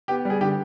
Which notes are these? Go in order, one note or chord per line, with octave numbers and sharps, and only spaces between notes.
B3 G4
G3 G#4
D3 G4